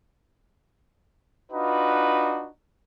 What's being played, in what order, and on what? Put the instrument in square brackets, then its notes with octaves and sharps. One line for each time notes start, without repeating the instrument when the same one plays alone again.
[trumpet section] D4 D#4 F4 F#4 B4